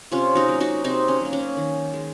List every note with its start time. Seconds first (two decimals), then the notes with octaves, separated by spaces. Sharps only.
0.12 C3 C#4 F4
0.35 D#4 F#4
0.48 F#3 A#3
0.60 D#4 F#4
0.84 C3 C4 D#4
1.08 C#4
1.21 F#3 A#3
1.33 C#4
1.57 D#3
1.94 G#3